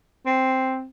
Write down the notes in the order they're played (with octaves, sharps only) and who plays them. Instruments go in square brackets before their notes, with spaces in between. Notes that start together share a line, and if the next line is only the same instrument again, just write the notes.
[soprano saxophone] C4